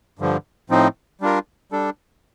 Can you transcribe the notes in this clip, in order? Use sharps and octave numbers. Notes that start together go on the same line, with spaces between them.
G2 D3 F3
A2 F3 C4 D#4
G3 D4 F4 A#4
G3 D4 A4